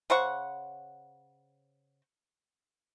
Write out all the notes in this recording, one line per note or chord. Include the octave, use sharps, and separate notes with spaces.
C#3 C5 F#5 C#6